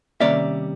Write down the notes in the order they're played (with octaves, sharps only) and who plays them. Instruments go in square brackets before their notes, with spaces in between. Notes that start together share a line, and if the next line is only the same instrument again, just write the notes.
[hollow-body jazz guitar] C3 D#3 G3 A#3 C#4 D5 E5